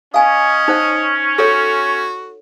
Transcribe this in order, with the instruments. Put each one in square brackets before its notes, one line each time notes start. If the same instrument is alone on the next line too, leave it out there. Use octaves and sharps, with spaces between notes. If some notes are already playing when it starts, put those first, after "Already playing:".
[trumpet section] C#4 [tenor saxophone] D#5 [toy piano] F5 G#5
[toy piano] D#4 C5 F#5
[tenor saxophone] F#4 [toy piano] A4 C#5